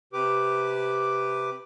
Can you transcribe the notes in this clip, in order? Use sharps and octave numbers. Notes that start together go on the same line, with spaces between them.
C3 G4 B4 D6